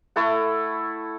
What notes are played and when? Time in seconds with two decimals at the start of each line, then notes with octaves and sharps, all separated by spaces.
0.16 A3 E4 A4 F#5